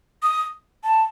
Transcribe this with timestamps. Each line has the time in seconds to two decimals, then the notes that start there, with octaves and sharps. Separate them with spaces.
0.23 D#6
0.84 A5